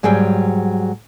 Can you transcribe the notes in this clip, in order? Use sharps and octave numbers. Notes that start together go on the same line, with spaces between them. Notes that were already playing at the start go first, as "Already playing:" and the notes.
G#2 F#3 G3 G#4 G5